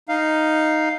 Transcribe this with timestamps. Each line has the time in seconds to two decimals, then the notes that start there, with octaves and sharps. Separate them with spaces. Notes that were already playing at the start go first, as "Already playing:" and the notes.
0.09 D#4 F5